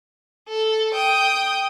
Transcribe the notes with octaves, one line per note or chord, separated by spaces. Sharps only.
A4
G5 D#6